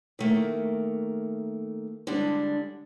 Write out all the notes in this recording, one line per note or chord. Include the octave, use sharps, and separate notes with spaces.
D#3 A3 A#3
D3 G3 G#3 D4